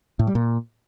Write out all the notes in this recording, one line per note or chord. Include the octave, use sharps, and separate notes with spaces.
A2
G3
A#2